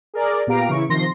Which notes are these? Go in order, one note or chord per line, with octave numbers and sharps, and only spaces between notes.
G#4 A#4 D5
A#2 B3 G4 F5 A#5 D7
C#3 E3 E4 C#6
C3 D#3 F3 C6 A#6